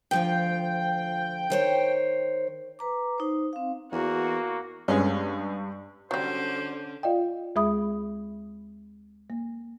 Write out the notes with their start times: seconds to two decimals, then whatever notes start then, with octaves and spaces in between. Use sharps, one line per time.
0.11 D2 F3 F4 G5
1.50 D#3 C5 C#5
2.79 B4 A#5 D6
3.18 D#4 C5
3.53 C4 F5
3.92 E2 A#3 F#4
4.88 G2 G#3 B3 C#4
6.11 D3 F#3 G3 C#4 C5
7.03 F4 D5 D#5 F5 G5
7.56 D2 G#3 G#4 E5 B5 D#6
9.30 A#3